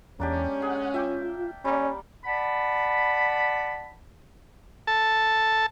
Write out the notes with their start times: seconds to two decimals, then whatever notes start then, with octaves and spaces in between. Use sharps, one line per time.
0.20 E2 G#3 A#3 C#4 D4 G4
0.62 G#4 F#5
0.94 F4 E5 G5 D6
1.65 G3 A#3 C#4 D5
2.24 D5 F#5 A5 B5
4.87 A4 A5